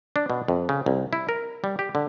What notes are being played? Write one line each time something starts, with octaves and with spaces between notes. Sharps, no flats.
D4
B2
F2
C#3
C2
E4
A#4
G3
G4
D3